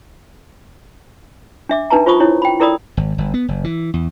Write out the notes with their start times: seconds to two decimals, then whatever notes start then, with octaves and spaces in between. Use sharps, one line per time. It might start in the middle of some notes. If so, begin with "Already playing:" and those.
1.69 D4 E5 D6
1.90 D4 D#4 B4 A5 A#5
2.06 F4 C5 B5 C#6 D#6
2.20 D4 E4 C#5
2.42 G5 B5
2.60 E4 A4 A#4 D5 B5 D#6
2.97 G#1
3.18 G1
3.34 B3
3.48 F#1
3.64 E3
3.94 E2